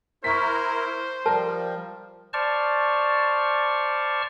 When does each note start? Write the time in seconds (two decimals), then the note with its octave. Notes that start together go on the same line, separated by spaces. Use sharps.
0.24 E4 A#4 C5 C#6 B6
1.26 F3 G3 A#4 A5
2.33 C5 D5 A5 C#6 F6